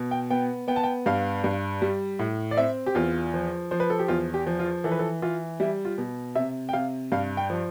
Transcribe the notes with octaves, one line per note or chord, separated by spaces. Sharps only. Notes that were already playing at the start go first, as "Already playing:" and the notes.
Already playing: B2
G5
B3 G5
B3 G5
A5
G5
G2 F5
G2
G3
A2
D5
C4 E5
G4
E2 F4
F3
F3 C5
B4
A4
G4
E2 F4
G4
F3
F4
E3 A4
B4
A4
E3 F4
G3 E4
F4
B2
C3 E5
G5
C3 F5
G2 F5
G5
F3